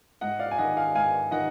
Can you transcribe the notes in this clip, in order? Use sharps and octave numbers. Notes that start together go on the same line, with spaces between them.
G#2 D#5 F#5
D5 F5
G#5
D#3 D#5 F#5
F5 G#5
G#2 F5 G#5
D#3 D#5 F#5